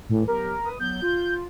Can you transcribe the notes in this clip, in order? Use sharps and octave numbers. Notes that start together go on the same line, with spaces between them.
A2 E3
F#3 B3 G4 A#4
B4 D#6
F#3 B3 G6
F4